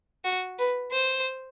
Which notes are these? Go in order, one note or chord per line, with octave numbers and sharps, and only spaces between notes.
F#4
B4
C5